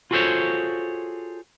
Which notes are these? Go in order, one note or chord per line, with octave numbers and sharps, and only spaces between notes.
F4 F#4 G#4 A4 C5 C#5